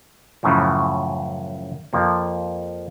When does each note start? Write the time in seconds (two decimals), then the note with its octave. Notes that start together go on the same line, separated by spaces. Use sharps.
0.43 F#2 A2 C#3 E3 F3
1.93 F2 F3 A#3